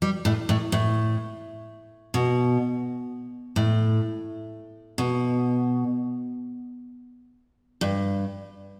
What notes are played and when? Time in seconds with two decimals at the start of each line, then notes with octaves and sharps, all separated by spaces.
0.02 G3
0.25 A2
0.49 A2
0.72 A2
2.14 B2
3.56 A2
4.98 B2
7.81 G2